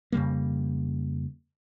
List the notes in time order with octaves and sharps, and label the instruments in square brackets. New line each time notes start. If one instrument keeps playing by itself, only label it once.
[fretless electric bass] F2 C#3 G3 A#3